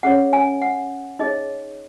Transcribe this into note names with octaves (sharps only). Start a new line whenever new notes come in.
C#4 G#4 C#5 F#5
G#5
F#5
D#4 G#4 C#5 D#5